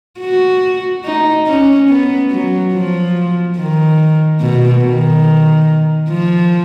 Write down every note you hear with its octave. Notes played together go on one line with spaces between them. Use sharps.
F#4
D#4
C#4
B3
F#3
F3
D#3
B2
D#3
F3